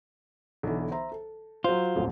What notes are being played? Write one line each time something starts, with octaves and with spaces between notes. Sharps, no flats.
B1 D3 E3
C5 E5 A#5
A4
F#3 F4 C5
D#1 A1 F2